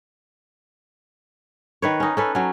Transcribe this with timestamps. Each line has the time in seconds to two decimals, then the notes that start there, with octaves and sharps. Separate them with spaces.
1.82 D#3 B4 C#5
2.00 C#4 D#4
2.17 C#4 A4 B4
2.35 F#3 C#4